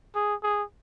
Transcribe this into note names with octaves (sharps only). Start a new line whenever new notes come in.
G#4
G#4